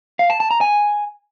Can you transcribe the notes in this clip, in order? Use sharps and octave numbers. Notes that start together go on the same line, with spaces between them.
F5
A5
A5
A#5
G#5